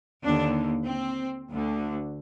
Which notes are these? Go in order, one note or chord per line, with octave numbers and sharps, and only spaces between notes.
D#2 D3 D4
C4
D2 D3